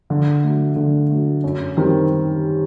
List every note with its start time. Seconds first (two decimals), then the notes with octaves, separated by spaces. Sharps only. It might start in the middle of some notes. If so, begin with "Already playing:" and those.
0.10 D3
0.43 F#3 A3
0.76 D3
1.10 F#3 A3
1.44 F#2
1.77 D#3 G3 C4